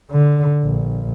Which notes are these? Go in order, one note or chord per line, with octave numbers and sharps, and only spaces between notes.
D3
A#1